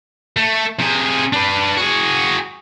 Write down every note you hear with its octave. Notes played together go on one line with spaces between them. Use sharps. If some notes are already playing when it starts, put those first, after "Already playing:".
A3
C3 G#4
D4 B4
F#4 G#4